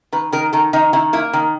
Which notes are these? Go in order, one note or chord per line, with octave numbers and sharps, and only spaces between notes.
D#3 B4
D#3 A#4
D#3 A4
D#3 D#4
D#3 E4
A#3 E4
D#3